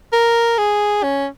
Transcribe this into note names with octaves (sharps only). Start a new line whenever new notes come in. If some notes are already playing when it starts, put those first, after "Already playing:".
A#4
G#4
C#4